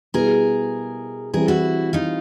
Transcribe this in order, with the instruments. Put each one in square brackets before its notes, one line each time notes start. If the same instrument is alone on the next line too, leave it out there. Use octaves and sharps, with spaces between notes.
[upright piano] B2 G3 B3 E4 [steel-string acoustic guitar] G#4 A#4
[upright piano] E3 G3 C4 [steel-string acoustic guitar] G#4 A#4
[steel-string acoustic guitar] E4 F#4
D#4 F4